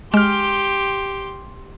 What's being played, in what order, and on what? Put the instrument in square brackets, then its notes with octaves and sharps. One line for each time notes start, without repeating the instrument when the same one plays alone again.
[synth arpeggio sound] G#3 F6 [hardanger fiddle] G4 C6